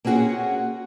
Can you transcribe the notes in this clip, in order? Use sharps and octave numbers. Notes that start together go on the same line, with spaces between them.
A#3 C4 C#4 F#4 G#4